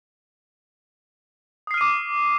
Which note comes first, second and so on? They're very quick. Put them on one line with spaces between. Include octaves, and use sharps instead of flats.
D#6 C7 F6 D#7 D6